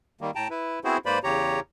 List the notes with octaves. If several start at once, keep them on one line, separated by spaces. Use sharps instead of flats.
D#3 G3 A#3
A2 G5 A5 A#5
E4 B4
B3 C4 E4 F#4 G#4 C5
G#2 A#3 B4 C5 D5 B5
E2 C#3 G4 C#5 A#5